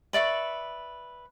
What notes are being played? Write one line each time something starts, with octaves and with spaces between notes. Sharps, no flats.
B4 D5 E5 C#6